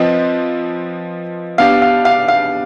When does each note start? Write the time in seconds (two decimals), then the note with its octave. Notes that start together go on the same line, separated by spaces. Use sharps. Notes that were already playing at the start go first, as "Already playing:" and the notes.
Already playing: F3 C4 F4 B4 D#5
1.58 B3 D4 G4 F5
1.82 F5
2.05 F5
2.28 F5